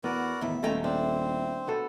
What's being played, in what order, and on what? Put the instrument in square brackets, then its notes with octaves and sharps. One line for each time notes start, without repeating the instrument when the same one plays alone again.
[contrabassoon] E2 [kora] B3 [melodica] F#4 A#4 D5
[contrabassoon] E2 [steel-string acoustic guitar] A2 D#3 [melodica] E5
[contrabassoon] D#1 [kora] G#3 A3 C#4 [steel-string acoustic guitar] F4 G5 A#5
[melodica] C4 C5 [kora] D4 [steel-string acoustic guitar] E4
[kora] B3 F#4 A4